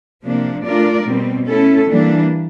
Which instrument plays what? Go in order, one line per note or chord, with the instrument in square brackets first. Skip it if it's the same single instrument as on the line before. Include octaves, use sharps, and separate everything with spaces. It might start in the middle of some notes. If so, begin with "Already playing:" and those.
[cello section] C3 F3 A#3 D4
A3 D4 F4 A#4 D5
B2 G3 C4
A3 C#4 E4 A4
E3 G3 A#3 D4